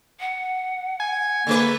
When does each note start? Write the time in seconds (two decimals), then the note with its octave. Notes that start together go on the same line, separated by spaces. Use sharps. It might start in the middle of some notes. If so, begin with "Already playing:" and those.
0.20 F#5
1.00 G#5
1.47 D3 G#3 A#3 B4